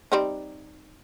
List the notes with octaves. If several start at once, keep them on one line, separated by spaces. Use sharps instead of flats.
G3 C4 D#4